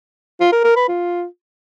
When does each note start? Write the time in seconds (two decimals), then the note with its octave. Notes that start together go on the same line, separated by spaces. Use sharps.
0.40 F4
0.52 A#4
0.64 A#4
0.76 B4
0.88 F4